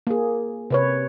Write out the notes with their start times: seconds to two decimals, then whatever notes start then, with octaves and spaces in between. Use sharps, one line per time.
0.07 A#3 G#4
0.70 C3 B4 C#5